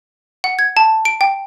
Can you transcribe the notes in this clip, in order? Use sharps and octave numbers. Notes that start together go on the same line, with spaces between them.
F#5
G#6
A5
D7
G5